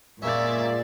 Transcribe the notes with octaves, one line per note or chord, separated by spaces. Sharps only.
A#2 G#3 A#3 C#4 D5 E5